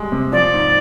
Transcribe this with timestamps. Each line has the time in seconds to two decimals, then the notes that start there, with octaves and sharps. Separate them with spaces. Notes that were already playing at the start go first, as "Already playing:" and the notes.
Already playing: G3 G#3
0.12 C3
0.32 F3 D5
0.54 G#2